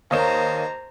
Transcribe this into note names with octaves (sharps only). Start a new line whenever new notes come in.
D#2 A#4 C5 C#5 D#5 F5 A#5 E7